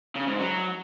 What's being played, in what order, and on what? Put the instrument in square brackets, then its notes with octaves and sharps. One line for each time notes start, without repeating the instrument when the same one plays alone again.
[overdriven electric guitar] C#3
G#2
F#3